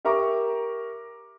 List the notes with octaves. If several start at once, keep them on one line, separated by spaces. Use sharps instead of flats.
G4 A#4 E5 A#5 C#6 D6